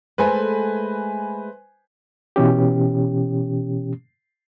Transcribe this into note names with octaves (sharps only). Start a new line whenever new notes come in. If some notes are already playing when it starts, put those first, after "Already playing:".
G#3 A3 A4 B4 C5 G#5
B2 E3 C#4 G4